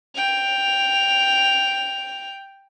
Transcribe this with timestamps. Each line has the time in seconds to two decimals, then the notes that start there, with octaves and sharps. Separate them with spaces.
0.15 G5 F7